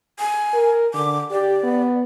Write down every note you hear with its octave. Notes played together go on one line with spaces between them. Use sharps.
G#5
A#4
D3 D6
G4 D5
B3